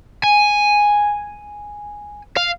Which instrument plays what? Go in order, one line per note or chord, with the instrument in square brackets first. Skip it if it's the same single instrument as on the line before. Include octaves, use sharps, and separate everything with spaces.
[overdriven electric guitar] G#5
F5